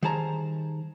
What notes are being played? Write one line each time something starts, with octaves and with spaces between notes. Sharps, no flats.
D#3 G3 G#4 C5 A5 A#5